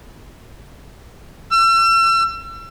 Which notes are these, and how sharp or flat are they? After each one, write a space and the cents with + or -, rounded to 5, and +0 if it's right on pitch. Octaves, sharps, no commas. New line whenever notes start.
E6 +35